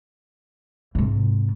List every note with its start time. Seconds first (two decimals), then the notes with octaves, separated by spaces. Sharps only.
0.95 G#2 C3